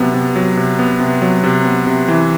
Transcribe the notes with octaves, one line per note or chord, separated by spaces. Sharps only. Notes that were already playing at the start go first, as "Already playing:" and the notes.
Already playing: C3 F#3 B3
C3
F#3
C3
B3
C3
F#3
C3
B3
C3
E3